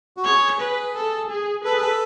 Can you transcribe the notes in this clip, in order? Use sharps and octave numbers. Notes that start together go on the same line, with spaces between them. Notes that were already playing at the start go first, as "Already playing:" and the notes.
F#4
G#4 C#5
B4
A4
G#4
A4 B4
G#4
A4